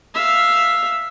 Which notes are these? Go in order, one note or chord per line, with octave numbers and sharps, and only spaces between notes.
E5 F5